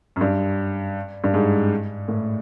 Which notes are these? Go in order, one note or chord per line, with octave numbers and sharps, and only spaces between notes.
F#2
G2
G2
G#2
A2